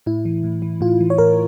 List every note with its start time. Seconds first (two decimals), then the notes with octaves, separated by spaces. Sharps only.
0.06 A2 E4
0.25 E3
0.44 A2
0.62 E3
0.81 A2 F4
1.01 E3
1.10 C#5
1.18 A2 A#4